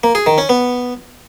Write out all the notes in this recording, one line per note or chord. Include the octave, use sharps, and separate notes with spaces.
A#3
G#4
D#3
C#4
B3